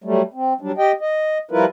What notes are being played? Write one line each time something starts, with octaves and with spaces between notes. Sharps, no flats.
F#3 G3 A3
C4
F#3 G3 D4
G4 D#5 G5
D#5
F3 G3 E4 F4 A#4 B4